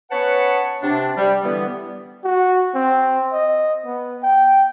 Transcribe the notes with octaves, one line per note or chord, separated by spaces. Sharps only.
B3 C#4 B4 C#5 F#5 A5
C3 D4
G3
D3 E3 G3 B3
F#4
C4
D#5
B3
G5